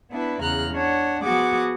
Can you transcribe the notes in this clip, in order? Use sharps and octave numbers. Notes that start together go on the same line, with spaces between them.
B3 D4 E4 B4
E2 C#3 A#5 F6 F#6
D4 C#5 F#5
F3 B3 F#4 G#4 F#5 D6